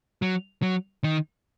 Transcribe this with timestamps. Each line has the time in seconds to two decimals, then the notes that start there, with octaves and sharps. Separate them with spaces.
0.22 F#3
0.62 F#3
1.04 D#3